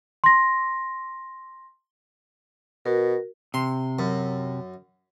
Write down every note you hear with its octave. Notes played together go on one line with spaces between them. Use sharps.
C6 A#6
B2 F#4 A#4
C3 C6
F#2